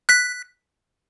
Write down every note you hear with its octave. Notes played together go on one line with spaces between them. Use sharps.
F#6 B6